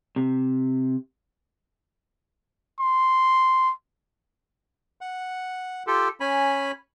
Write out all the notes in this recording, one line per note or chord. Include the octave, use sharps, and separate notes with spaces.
C3
C6
F#5
F4 G4 A4
C#4 G#5 B5